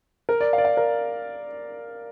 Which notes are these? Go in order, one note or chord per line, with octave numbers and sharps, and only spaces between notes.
A#4
D5
F5
D5
F5
A#4